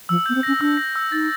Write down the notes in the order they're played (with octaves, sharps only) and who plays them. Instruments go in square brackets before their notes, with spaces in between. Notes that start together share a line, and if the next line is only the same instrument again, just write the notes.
[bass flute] F3 [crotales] E6
[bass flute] B3 [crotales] G6
[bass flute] C4
[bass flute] C#4 [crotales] A#6
[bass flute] D4 [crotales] E6
[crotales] A#6
E6
[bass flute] D#4 [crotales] A6